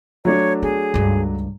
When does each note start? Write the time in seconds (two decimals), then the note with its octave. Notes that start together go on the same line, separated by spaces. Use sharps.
0.25 F#3 A3 D4 C#5
0.63 B3 G#4
0.94 C#2 G2